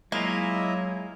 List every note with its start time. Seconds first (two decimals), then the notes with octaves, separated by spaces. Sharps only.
0.12 F#3 G#3 A#3 E4 F4 D#5 E5